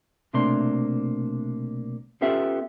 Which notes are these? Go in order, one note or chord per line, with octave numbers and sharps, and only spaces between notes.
B1 C3 A3 A#3 D4 C6
B3 C#4 F4 G4 A4 E5